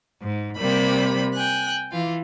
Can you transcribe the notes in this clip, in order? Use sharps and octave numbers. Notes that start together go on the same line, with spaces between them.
G#2
C3 G3 A#3 B5
G5 G#5 F#6
E3 F4